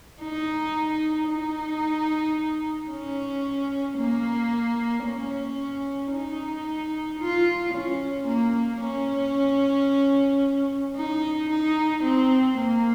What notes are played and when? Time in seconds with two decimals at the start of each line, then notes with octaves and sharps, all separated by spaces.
0.21 D#4
1.29 D#4
2.90 C#4
3.98 A#3
5.05 C#4
6.12 D#4
7.19 F4
7.74 C#4
8.27 A#3
8.81 C#4
10.96 D#4
11.49 D#4
12.03 C4
12.57 A#3